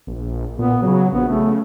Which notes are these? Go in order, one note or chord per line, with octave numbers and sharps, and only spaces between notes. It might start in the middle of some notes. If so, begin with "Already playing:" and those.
A#1
A#2 B3
C#3 F#3
A#1 B3
C#3 A3